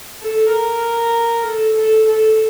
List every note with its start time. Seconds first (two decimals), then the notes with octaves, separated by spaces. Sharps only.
0.21 A4
0.52 A#4
1.45 A4
1.76 A4
2.07 A4